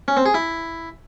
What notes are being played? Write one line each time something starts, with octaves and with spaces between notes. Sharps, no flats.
C#4
C4
G#4
E4